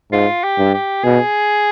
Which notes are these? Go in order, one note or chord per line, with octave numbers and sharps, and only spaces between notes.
G#2 F4
G4
G2
G4
B2 G#4